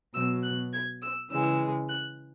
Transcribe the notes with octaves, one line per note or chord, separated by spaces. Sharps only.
B2 F#3 E6
F#6
G#6
E6
C#3 E3 G#3 E6
F#6